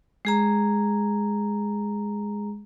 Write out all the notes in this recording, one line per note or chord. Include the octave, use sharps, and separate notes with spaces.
G#3 G#4 A#5